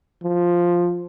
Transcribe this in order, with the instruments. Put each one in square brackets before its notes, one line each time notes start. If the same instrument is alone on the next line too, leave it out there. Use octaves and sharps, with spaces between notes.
[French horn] F3